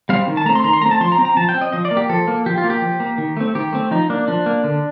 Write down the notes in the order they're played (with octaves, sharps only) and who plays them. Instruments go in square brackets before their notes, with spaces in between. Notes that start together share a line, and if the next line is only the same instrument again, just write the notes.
[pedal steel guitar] G3 C4 F5
D#3
A5
A3 C4 A#5
C6
D#3 A#5
C6
A3 C4 A#5
A5
F3 C6
A#5
C4
A#5
F3 A5
G5
C4
D#5
F3 D#5
D5
A#3
G4
F3 A4
A#3
F3 G4
F4
A#3
G4
F3
A#3
D#3
A3 C4
D#3 G4
A3 C4
F3 D#4
A#3 D4
F3 D4
A#3
D3